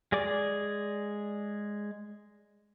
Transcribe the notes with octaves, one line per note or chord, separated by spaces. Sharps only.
G#3 G#4 D5 D6